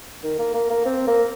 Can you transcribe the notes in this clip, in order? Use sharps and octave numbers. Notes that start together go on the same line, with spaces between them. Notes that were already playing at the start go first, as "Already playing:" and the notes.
D#3
A#3
A#3
A#3
C4
A#3